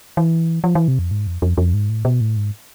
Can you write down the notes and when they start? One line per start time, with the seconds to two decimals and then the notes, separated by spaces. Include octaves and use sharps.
0.17 E3
0.64 F3
0.75 E3
0.88 C3
0.99 F2
1.11 G#2
1.27 F2
1.42 F2
1.57 F2
1.74 G#2
1.89 A2
2.05 B2
2.21 A2
2.37 G#2